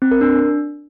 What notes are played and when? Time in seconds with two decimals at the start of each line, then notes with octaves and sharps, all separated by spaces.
0.02 C4
0.11 A#4
0.21 D4